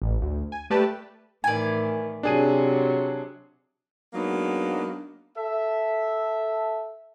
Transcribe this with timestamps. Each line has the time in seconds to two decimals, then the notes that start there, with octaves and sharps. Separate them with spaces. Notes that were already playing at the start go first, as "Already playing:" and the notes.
0.02 A1
0.22 D2
0.52 G#5
0.70 A3 G4 B4 D5 A5
1.44 A2 D#3 E3 D5 G#5
2.23 C3 F#3 D4 G#4 D#7
4.14 F#3 G#3 A#3 B3 D4 D#4
5.37 A4 E5